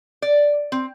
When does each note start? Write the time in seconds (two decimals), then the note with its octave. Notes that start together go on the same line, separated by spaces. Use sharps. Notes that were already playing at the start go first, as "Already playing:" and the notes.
0.22 D5
0.72 C4